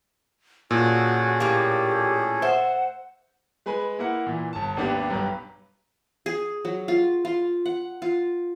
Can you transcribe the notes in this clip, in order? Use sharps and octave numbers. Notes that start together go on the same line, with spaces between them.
A#2 C#4 F#4 G#4 A4
A2 A#3 G4
C5 E5 F#5
G#3 B4 G#5 B5
A#3 E4 A#4 F#5
A#2 E3
G1 A5
G#1 D#2 B3 D4 G4
B1 G2 G4 B4 A#5
G#4
F#3
F4
F4
F#5
F4